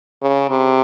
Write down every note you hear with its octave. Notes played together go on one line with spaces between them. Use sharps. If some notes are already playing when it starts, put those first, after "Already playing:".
C#3
C3